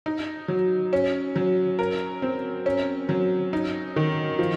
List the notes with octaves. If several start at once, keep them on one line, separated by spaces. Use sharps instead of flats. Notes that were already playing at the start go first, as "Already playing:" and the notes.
D#4
F#3
C#4
F#3
A#4
C4
C#4
F#3
D#4
D#3
F3